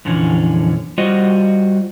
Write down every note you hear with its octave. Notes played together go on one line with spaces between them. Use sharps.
F2 A#2 D3 E3 C#4
G3 F4 F#4 C5 D#5